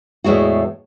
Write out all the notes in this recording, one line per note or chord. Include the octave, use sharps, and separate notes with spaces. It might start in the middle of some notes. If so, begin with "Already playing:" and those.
E2 A2 G#3 F#4